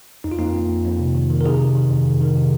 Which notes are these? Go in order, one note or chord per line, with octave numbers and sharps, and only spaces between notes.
F2 D#4
F4
F2 A#3 D#4
F2
F2
F2
C3
D#3
D#3
A#4
C3 D#4 G#4
C3
D#3
F2
D#3
D#3
C3